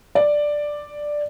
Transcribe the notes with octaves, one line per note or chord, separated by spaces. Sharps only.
D5